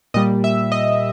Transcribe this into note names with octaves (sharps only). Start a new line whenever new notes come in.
A#2 G3 D#5
E5
D#5